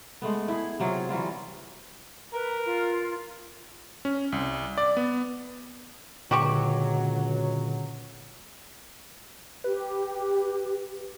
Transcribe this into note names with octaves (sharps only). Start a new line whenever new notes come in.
G#3 A3 B3
E4 G#4
C3 F#3 F4 G#4
E3 F#3 G3 F4
A#4 B4
F4
C#4
C2
D5
B3
C#2 A#2 D3 F#3 F#4 G4 C#6
G4 B4